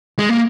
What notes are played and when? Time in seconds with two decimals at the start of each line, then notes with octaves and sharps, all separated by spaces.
0.19 G#3
0.29 A#3